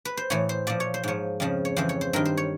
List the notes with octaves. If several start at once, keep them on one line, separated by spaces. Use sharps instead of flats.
B4
C5
A2 E3 C#5
C5
A#2 F3 D5
C#5
C5
G#2 F3 C#5
F2 C#3 F3
C#5
F2 C#3 E3 C5
C#5
C5
G2 D#3 A#4
C5
C#5